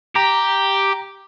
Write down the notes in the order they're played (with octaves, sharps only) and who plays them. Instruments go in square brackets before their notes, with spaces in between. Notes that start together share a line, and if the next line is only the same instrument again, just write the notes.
[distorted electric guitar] G4 [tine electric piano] A#5